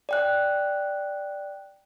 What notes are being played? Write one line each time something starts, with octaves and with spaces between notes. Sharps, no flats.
D5 G5 F#6